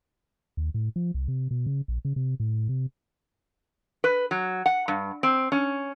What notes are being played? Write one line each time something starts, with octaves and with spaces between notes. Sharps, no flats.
D#2
A2
F3
C2
C3
B2
C#3
A#1
C#3
C3
A2
C3
B4
F#3
F#5
G2
C4
C#4